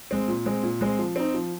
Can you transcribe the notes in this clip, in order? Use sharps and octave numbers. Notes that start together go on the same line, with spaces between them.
G#3 C4
A#2
G#3 C4
A#2
G#3 C4
F3
C4 D#4
F3